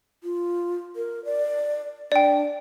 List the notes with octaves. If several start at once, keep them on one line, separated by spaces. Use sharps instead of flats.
F4
A#4
D5
D4 D5 G5